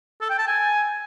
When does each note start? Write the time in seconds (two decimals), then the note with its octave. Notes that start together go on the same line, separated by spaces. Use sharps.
0.21 A4
0.30 G5
0.38 A5
0.47 G#5